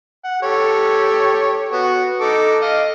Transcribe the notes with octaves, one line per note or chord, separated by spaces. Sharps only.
F#5
G4 A4 C#5
B3 F#4
D#4 A4 D6
D#5 F5